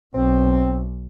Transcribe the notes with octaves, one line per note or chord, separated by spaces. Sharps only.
B1 C4